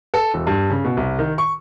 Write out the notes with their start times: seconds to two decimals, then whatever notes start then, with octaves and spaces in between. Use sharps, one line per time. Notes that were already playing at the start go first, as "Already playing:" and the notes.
0.14 A4
0.34 E1
0.47 G2
0.70 C#3
0.85 B2
0.97 C2
1.19 D#3
1.38 C#6